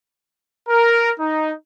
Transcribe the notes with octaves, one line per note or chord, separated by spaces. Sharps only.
A#4
D#4